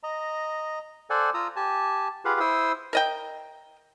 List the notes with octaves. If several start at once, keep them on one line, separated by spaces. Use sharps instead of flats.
D#5 A#5
A4 C5 D5 F#5 G#5
F4 A#5 D#6 E6
G4 G#5 A5
F4 G4 G#4 B4 F5 F#5
E4 C5 C6 D#6 E6
A#4 D#5 G5